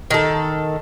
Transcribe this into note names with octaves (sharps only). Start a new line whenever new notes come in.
D#3 A4